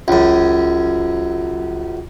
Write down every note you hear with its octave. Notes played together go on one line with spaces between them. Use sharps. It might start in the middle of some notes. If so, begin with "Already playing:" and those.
C#2 F#2